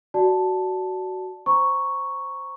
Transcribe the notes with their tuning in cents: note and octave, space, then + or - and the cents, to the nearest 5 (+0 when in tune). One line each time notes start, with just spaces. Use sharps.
F#4 +10 D5 +0 A5 +0
C5 +0 A#5 +10 C#6 +0